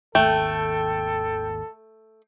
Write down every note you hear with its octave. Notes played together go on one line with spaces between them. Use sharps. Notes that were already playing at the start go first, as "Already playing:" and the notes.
G#1 D#2 A3 A4 G5